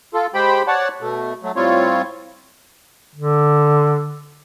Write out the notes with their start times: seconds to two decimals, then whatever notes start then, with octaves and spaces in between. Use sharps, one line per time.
0.14 F4 A4
0.34 G#3 G4 C5 G5 B5
0.67 C#5 D5 F#5 A5
1.01 B2 A3
1.43 F#3 A3
1.56 A2 G3 C4 F4 C#5
3.15 D3